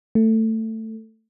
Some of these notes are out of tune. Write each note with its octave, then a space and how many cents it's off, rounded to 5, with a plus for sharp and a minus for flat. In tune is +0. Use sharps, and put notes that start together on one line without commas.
A3 +15